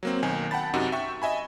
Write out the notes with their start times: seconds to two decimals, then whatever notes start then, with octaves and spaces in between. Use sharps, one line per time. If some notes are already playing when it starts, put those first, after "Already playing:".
0.03 F#3 A#3 C4
0.23 B1 D#3 G#5
0.51 F#5 G5 A5 B5 A6
0.74 F#2 C3 D#4 F#4
0.92 E5 G5 C#6
1.22 D#5 E5 G#5 B5